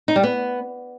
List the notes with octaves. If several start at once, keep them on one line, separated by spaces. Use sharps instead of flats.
D#4
G3
B3